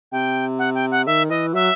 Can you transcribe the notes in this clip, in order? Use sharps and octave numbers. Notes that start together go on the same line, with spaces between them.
C3 G5
F#5
G5
F#5
D#3 E5
E3 D#5
F#3 E5